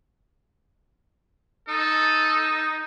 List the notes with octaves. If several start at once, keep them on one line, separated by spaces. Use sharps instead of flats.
D#4 A4